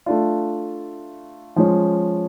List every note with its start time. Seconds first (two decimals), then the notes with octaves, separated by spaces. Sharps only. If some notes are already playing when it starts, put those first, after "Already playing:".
0.06 A3 D4 F4
1.56 F3 G#3 C#4